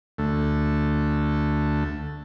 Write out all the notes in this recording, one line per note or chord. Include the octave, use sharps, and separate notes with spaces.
D2 A3